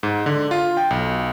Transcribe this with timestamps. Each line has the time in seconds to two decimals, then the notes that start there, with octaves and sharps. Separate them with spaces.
0.03 G#2
0.26 D3
0.51 F4
0.77 G5
0.90 B1